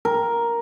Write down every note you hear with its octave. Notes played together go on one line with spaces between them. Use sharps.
A#4